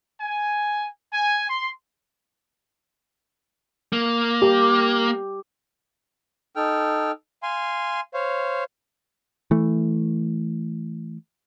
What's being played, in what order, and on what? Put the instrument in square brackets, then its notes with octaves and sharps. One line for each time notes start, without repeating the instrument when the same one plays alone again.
[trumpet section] G#5
G#5
C6
[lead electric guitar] A#3
[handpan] G4
[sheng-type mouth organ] D#4 A4 G5 F6
F5 G#5 C6
C5 C#5 F5
[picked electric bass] E3 A3